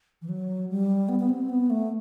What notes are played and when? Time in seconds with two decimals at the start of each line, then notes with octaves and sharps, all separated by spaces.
0.22 E3
0.29 F#3
0.69 G3
1.09 B3
1.19 B3
1.29 C4
1.49 B3
1.70 A3